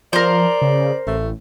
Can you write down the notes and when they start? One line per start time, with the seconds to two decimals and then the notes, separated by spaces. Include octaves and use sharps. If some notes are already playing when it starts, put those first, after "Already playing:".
0.13 F3 A#4 C5 D5
0.62 C#3
1.07 A1 A3